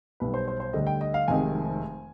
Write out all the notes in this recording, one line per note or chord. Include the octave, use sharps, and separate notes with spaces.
B1 B2 G3 B4
C5
C5
C5
D2 D3 G3 D#5
G5
D#5
F5
F1 F2 C3 D#3 G#3 G#5